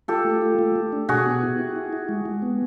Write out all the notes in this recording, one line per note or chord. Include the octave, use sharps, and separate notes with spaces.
F4 G4 A4
A3
F4
A3
A3
D4
B2 F#4 G#4
B3
E4
E4
E4
E4
G#3
G#3
B3